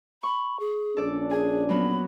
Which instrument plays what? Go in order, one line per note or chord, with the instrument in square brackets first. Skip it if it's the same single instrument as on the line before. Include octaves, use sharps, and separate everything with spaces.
[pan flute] B5 [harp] C#6
[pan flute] G#4
[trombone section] A#1 C#4 D4 [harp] A4 D5
[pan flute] G#4 [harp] G#5
[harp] F#3 A#3 B3 [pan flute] B5